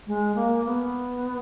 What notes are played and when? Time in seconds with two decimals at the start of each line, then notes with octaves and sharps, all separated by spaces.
0.07 G#3
0.35 A#3
0.65 B3